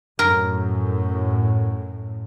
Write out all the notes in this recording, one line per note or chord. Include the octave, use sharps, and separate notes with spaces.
F#2 A2 A#4